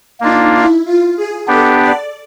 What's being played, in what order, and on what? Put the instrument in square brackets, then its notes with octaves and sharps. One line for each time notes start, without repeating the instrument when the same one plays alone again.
[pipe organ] A#3 D4 F4 [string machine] D#4
[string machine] E4
F4
G#4
[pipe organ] B3 D4 G4 [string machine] A4
[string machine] D5